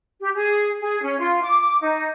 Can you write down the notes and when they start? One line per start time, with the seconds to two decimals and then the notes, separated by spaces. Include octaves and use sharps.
0.20 G4
0.34 G#4
0.80 G#4
1.02 C#4
1.19 F4
1.42 D6
1.81 D#4